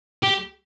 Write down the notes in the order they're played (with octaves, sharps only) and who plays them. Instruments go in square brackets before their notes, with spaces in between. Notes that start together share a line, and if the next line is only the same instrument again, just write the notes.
[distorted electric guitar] G4